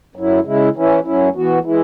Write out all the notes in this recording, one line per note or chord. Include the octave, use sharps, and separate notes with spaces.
F#2 F#3 E4
C#3 G#3 E4
E3 C#4 E4
F#2 F#3 C#4 E4
E3 B3 F#4
E3 G#3 E4